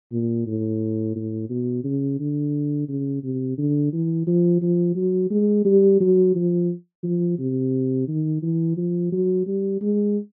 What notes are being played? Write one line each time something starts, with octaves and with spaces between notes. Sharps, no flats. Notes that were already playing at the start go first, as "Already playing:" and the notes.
A#2
A2
A2
B2
C#3
D3
C#3
C3
D3
E3
F3
F3
F#3
G#3
G3
F#3
F3
F3
C3
D#3
E3
F3
F#3
G3
G#3